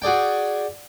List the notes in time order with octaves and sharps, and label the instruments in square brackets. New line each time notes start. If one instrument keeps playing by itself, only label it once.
[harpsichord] F#4 G#4 D5 G5